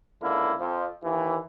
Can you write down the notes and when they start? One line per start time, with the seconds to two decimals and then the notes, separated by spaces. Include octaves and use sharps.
0.21 C#2 D3 A#3 E4
0.59 F2
1.03 D#2 E3